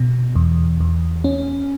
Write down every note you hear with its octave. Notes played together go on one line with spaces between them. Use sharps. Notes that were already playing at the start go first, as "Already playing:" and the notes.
Already playing: B2
E2
E2
C#4